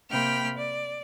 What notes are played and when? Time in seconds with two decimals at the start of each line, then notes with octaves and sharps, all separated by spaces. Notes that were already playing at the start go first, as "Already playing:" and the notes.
0.10 C3 A#3 G5 B5 F6 G6
0.56 D5